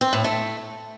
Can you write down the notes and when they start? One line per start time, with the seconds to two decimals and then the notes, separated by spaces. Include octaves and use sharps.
0.01 C4
0.13 A2
0.24 A3